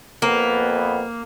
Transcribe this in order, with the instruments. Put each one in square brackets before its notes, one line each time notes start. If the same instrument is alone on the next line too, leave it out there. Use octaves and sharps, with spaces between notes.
[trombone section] F2 B3 [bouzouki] A#3